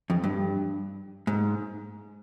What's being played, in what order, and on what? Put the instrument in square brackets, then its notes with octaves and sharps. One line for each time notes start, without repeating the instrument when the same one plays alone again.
[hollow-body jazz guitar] F2
G2
G#2